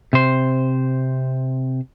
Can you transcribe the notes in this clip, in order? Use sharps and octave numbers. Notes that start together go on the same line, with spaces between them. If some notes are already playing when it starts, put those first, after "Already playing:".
C3 C5